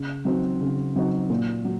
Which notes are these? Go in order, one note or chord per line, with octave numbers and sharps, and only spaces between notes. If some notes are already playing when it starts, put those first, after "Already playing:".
Already playing: C#3
F#3 C4 D#4 F#4
C#3
F#3 C4 D#4 F#4
A#2
F#3